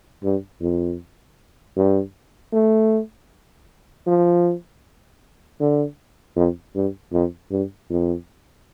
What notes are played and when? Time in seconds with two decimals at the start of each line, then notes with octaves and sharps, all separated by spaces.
0.24 G2
0.61 F2
1.77 G2
2.53 A3
4.07 F3
5.61 D3
6.36 F2
6.75 G2
7.13 F2
7.51 G2
7.90 F2